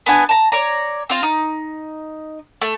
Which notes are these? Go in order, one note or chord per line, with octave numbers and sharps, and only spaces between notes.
B3 D4 G#5
A5 A#5
C#5 D5 A#5
C4 F4
D#4
A3